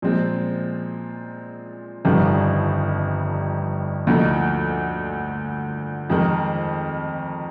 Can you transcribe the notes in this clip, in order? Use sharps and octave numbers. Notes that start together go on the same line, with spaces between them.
A#2 F3 G#3 C4
G1 F2 D#3 G3 D4
D2 D3 F3 A#3 D#4
F2 D#3 G#3 D#4 A#4